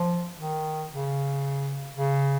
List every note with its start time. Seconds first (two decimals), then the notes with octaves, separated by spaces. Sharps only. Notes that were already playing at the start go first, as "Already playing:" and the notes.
Already playing: F3
0.39 D#3
0.92 C#3
1.95 C#3